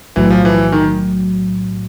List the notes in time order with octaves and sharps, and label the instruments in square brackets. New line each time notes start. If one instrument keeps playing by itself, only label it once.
[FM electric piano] B1 A2 F#3 [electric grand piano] E3
[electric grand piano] F3
E3
D#3